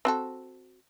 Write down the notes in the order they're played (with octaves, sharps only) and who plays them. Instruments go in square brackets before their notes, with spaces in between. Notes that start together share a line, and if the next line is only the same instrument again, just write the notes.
[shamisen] C4 F#4 A4